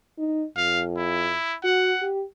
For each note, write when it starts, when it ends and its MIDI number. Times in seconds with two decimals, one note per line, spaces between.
0.18 0.45 63
0.57 1.35 41
0.57 0.83 77
0.97 1.56 64
1.64 1.93 66
1.64 2.07 78
2.02 2.23 67